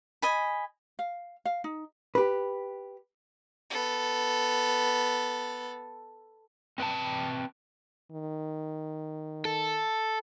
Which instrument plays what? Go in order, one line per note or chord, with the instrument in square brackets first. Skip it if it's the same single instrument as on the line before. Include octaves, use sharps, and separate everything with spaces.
[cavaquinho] D#5 G#5 B5
[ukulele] F5
F5
D#4
[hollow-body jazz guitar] G4 B4
[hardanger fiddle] B3 A4
[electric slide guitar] C4 B4 G5 A5
[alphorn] D#3
[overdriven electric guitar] A4